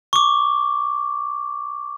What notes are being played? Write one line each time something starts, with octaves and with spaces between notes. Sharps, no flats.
C#6 D6